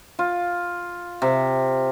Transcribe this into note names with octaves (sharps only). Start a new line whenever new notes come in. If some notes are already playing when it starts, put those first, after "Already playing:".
F4
C3